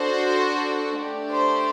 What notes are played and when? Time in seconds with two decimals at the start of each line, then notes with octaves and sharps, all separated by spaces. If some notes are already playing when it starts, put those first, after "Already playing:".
Already playing: D4 F#4 A4 C5
0.99 A3 D4 G4
1.31 C5